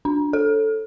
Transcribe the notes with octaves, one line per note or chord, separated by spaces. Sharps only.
D4
A4